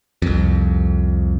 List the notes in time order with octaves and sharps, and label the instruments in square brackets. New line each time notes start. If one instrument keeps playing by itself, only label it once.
[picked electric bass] C2 F2